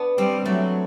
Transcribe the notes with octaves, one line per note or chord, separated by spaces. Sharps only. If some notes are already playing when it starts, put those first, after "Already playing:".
Already playing: B3 D4
G3 C4
F#3 A3